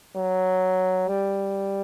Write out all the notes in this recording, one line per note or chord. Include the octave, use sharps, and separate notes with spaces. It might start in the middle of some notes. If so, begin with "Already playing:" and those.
F#3
G3